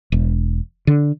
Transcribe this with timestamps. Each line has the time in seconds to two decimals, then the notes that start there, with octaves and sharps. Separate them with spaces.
0.12 E1
0.87 D3